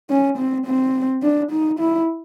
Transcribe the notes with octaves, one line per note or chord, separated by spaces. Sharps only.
C#4
C4
C4
D4
D#4
E4